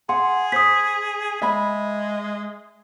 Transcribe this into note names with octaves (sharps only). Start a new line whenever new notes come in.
G#4 F#5 C6
C5 D#6 B6
G#3 E5 B5